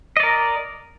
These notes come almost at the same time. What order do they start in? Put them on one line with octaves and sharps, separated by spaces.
D#5 D5 A#4